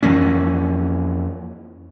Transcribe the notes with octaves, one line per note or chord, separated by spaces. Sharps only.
F2 E3 A#3 C#4